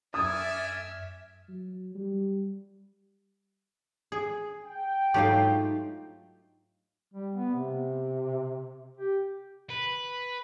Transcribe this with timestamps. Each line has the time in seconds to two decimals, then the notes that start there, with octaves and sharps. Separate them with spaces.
0.14 F#2 A3 D5 E5 G#5 D#6 F6
1.48 F#3
1.95 G3
4.12 G#4
4.65 G5
5.14 G#2 F#3 A3 D#4 F4 G4
7.14 G3
7.36 B3
7.55 C3
8.97 G4
9.70 B4